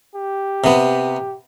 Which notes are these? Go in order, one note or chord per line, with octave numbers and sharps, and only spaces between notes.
G4
C3 B3